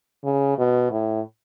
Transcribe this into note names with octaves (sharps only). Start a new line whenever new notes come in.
C#3
B2
A2